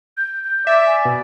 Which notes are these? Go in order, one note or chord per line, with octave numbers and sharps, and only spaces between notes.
G6
G6
D5 E5
G#5
B2